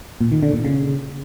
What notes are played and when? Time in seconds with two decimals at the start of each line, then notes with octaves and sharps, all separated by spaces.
0.21 A#2
0.32 D#3
0.43 D3
0.54 A#2
0.65 C#3